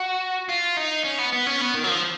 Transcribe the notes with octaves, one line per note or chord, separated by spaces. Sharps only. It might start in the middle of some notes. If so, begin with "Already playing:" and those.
Already playing: F#4
F4
D#4
C#4
B3
B3
C#4
B3
D#3
F#3
F3